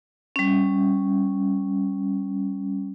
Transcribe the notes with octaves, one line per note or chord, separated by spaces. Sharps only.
G3 C#4